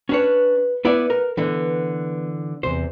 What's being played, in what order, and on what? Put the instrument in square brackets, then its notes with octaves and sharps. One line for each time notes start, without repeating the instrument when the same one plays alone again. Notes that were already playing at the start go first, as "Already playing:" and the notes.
[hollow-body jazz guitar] C#4 D4 C#5 [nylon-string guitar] F#4 B4
[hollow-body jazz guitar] B3 E4 D5 [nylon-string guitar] B4 F#5
[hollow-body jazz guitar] A#4
[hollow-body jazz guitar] D3 E3 [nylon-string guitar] B3
[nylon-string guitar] E2 C3 [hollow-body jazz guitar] C5